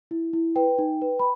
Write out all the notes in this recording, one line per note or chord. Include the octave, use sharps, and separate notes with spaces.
E4
E4
B4 G5
D#4
B4
B5